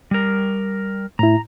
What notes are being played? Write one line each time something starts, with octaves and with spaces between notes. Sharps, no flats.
G3 A#4
A2 E4 A#5